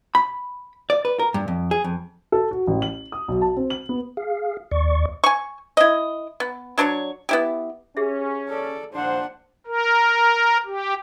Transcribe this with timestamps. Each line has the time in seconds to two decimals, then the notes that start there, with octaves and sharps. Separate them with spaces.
0.15 B5
0.90 D5
1.05 B4
1.19 A#4
1.34 G2
1.48 F2
1.71 G#4
1.84 F2
2.32 A4
2.51 F#4
2.67 A1
2.82 F#7
3.12 D#6
3.28 B1
3.42 A5
3.57 C4
3.70 F#7
3.89 B3
4.17 G#4 F5
4.71 D#2 D5 C#6
5.24 G#5 C#6
5.77 E4 D#5
6.40 B3
6.78 F#3 D4 C5 C#5
7.29 B3 E4 G4
7.97 C#4 G4 G#4 E5
8.49 A4 D5
8.93 A#1 D4 C5 F#5
9.67 A#4
10.66 G4